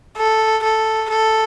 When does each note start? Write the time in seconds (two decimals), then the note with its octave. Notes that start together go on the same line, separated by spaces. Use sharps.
0.17 A4
0.63 A4
1.10 A4